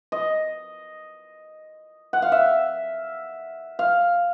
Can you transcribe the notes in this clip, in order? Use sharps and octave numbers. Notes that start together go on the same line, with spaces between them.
D#5
F#5
F5
E5
F5